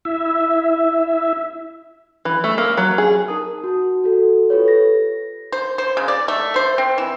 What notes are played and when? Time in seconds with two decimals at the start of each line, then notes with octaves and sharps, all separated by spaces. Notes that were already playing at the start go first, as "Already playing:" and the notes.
0.05 E4 E5
2.25 E3
2.44 A3
2.58 A#3
2.77 F#3
2.98 G#4
3.28 D#4 A#4 A5 D#6
3.64 F#4 A5
4.04 F#4 A4
4.50 F4 G4 A4 B4 C#5
4.68 A#6
5.52 C5
5.78 C5
5.97 C#3
6.08 D5
6.28 A3
6.56 C5
6.78 C4
6.98 E3